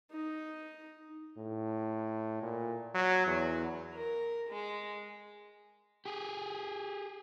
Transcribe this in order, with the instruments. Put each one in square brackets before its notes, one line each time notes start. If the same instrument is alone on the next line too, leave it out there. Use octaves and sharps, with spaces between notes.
[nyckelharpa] D#4
[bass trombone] A2
A#2
F#3
E2
[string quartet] A#4
G#3
[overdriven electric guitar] G4 G#4